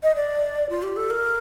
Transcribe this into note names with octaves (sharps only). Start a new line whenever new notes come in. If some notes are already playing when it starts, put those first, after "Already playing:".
D#5
D5
F4
G4
A4
A#4